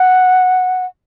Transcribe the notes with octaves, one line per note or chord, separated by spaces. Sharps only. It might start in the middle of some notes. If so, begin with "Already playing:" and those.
Already playing: F#5